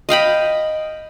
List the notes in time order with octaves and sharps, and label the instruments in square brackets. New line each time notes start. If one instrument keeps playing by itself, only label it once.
[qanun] D#5 F5 G5 B5